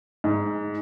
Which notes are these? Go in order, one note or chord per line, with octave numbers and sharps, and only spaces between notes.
G#2